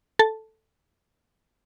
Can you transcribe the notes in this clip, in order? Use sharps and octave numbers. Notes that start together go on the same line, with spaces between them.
A4 A5